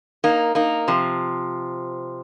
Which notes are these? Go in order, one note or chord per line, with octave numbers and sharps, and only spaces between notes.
A#3 D#4
A#3 D#4
C3 F3